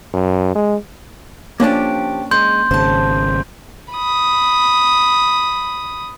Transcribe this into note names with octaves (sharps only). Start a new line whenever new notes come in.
F#2
G#3
F3 A#3 C#4 D4 G4
G#3 C6 G6
G#1 C#3 C5 A5
B5 D#6